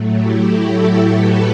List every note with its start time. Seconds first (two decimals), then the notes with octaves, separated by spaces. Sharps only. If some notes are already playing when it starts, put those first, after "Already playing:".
Already playing: A2 F#3 A3
0.11 E4 G4
0.44 F#4 A4
1.10 G4 B4